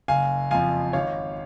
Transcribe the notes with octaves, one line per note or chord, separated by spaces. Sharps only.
F#1 F5 G#5
F2 F3 F5 G#5
G#1 C#5 F5